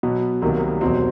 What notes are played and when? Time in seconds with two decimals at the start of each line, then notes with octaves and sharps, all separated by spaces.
0.03 B2 F#3 B3
0.42 C2 C3 D#3 F#3 A#3
0.81 E2 B2 F#3 C4